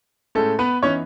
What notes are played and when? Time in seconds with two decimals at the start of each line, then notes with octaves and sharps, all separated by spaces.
0.35 A2 G#3 A3 C#4 A4
0.59 B3 B4
0.83 E3 B3 C#4 D#4 C#5